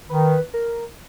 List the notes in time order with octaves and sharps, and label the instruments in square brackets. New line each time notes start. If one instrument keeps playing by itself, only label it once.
[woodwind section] D#3 [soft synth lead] B4
[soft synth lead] A#4